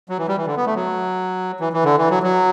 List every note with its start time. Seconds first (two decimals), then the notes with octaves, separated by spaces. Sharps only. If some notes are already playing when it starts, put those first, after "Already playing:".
0.09 F#3
0.18 E3
0.28 G3
0.37 E3
0.47 D3
0.57 B3
0.66 A3
0.75 F#3
1.60 E3
1.73 E3
1.85 D3
1.98 E3
2.10 F#3
2.23 F#3